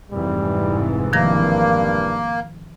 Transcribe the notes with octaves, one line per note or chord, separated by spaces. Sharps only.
F1 G#2 E3 G3
G2 D#3 F3 A#3 A#6